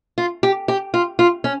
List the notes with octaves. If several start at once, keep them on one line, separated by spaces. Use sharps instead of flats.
F4
G4
G4
F4
F4
C#4